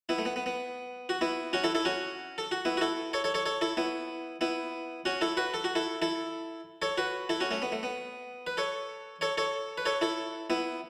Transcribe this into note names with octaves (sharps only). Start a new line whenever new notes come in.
B3 E4
A3
B3
B3
B3
F#4
B3 E4
C#4 F#4
E4 A4
E4 A4
C#4 F#4
A4
F#4
B3 E4
F#4
E4 A4
A4 C#5
A4 C#5
A4 C#5
A4 C#5
E4 A4
B3 E4
B3 E4
C#4 F#4
E4 A4
F#4 B4
A4
F#4
E4 A4
E4 A4
A4 C#5
F#4 B4
E4 A4
C#4 F#4
A3 C#4
B3
A3
B3
B4
A4 C#5
A4 C#5
A4 C#5
B4
A4 C#5
E4 A4
B3 E4